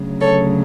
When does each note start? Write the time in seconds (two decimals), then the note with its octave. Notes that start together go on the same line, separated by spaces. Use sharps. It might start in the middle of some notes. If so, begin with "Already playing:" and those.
Already playing: D2 C#3 F#3
0.21 A4 C#5